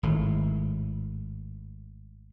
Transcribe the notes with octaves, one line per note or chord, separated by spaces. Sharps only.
G#1 A2